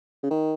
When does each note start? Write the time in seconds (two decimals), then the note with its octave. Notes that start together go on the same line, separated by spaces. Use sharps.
0.23 C#3
0.30 D#3